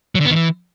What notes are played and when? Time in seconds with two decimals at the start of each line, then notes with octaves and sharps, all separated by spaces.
0.15 F#3
0.20 D3
0.25 B3
0.30 D#3
0.36 E3